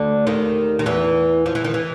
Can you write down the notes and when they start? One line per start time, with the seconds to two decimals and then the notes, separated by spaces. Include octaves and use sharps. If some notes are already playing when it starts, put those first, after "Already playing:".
Already playing: D2 D3
0.27 D#2 D#3
0.79 D#3
0.86 E2 E3
1.46 F3
1.55 E3
1.64 D#3
1.74 E3